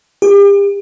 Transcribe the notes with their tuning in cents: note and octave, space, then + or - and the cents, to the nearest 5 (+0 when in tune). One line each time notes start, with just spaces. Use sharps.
G4 +40